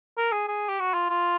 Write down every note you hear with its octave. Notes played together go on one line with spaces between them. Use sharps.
A#4
G#4
G#4
G4
F#4
F4
F4